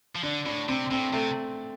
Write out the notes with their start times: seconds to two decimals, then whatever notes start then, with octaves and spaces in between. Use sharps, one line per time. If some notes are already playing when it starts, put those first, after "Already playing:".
0.16 F3
0.23 D3 D4
0.46 A2 D4
0.69 C3 C4
0.91 A2 C4
1.13 C3 A3